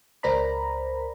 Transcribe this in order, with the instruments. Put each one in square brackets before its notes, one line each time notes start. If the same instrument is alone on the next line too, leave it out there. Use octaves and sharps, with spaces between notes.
[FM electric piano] C#2 A#4 C5 D5 A#5 B5